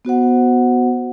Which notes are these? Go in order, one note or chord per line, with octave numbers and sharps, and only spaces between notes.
B3 F#4 C5 F#5